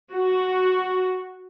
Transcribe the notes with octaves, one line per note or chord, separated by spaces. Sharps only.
F#4